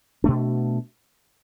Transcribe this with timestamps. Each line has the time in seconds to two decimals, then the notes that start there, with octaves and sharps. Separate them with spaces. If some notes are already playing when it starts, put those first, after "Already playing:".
0.24 B2 A3 D4